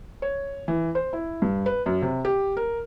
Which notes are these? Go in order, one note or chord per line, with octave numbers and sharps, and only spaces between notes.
C#5
E3
C5
E4
G2
B4
F#2
C3
G4
A#4